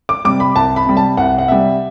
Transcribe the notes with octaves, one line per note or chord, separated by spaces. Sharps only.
D6
C3 G3 D6
B5
C2 A5
B5
C3 G3
A5
C2 F#5
F#5
C3 G3 E5